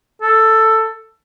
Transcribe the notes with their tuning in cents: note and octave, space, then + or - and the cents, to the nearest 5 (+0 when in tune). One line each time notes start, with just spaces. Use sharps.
A4 +10